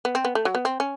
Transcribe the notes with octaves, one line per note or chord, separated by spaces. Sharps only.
B3
C4
B3
A3
F#3
B3
C4
C#4